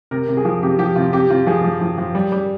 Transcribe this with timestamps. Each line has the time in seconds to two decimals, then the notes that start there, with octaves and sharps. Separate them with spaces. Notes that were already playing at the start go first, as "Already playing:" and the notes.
0.11 C3 A#4
0.28 C3
0.37 G#4
0.45 F3
0.63 C3 G4
0.79 F3 G4
0.96 C3 F4
1.13 C3 G4
1.30 C3 F4
1.47 F3 G#4
1.64 F3
1.81 F3
1.98 F3
2.15 G3
2.32 G3